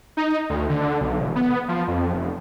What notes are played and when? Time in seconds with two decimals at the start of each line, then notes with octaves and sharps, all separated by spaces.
0.17 D#4
0.50 D2
0.70 D3
1.01 B1
1.20 E1
1.36 B3
1.68 F3
1.88 F2
2.14 F1